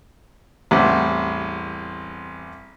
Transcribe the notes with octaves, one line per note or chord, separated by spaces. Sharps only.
A1 E2 G3 C4 F#5